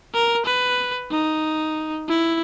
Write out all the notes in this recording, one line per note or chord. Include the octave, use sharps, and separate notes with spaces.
A#4
B4
D#4
E4